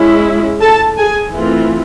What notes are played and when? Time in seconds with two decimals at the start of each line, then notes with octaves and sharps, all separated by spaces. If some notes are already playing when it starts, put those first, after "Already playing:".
Already playing: G#3 C#4 E4
0.61 A4 A5
0.97 G#4 G#5
1.33 E3 A3 C4 F4